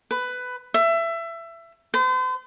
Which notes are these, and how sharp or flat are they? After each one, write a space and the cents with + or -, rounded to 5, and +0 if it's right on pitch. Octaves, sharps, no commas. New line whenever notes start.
B4 +15
E5 +20
C5 -40